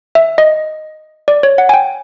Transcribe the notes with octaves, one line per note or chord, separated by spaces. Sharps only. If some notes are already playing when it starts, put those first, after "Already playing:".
E5
D#5
D5
C#5
F#5
G#5
G5